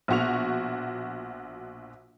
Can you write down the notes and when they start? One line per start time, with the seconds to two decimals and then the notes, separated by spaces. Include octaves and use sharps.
0.08 A#1 B2 F#4 C#6 F7